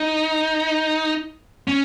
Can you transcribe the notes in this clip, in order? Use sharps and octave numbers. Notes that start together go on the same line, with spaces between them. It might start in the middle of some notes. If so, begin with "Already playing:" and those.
Already playing: D#4
C#4